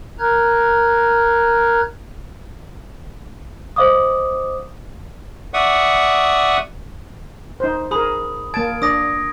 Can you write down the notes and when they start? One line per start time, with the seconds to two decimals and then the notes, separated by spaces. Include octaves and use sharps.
0.19 A#4 A#5 F6 F#6 G#6
3.76 C5 D#5 F5 D6 D#6
5.54 D5 E5 F#5 C#6 D#6
7.60 D#4 C5
7.91 G#4 A#4 B5 D#6
8.54 A#3 A5 G#6 D7
8.82 D4 D5 D#6 A#6